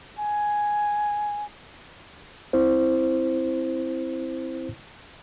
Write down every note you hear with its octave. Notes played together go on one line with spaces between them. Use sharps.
G#5
C4 E4 C5